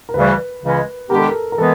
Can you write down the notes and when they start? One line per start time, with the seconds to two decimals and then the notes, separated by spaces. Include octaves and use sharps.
0.09 A#4
0.14 D2 C#3 E3 G3 B4
0.62 C#2 C#3 E3 G#3 C#4
1.10 D#3 G#3 B3 D4 G4 A#4
1.18 A4
1.26 A#4
1.52 A#4
1.57 E3 G#3 B3 A4